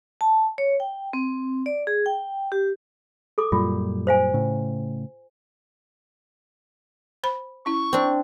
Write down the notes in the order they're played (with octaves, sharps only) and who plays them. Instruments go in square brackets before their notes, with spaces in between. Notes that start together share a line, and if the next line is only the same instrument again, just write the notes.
[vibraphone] A5
C#5
G5
C4
D5
G#4
G5
G4
[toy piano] A4 D6
[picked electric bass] F#2 A#2 G3 [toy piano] F4
[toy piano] C5 F5 G#5
[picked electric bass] A2 C#3
[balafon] C5 B5
[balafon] C#4 E4 [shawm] C#6
[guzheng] C4 D4